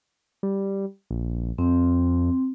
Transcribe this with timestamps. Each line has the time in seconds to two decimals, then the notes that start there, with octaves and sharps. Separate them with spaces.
0.43 G3
1.11 A#1
1.58 F2 C4